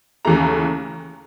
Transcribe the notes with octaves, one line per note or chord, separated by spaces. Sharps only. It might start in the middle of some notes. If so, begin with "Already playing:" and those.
D#2 C#3 E3 A3 A#5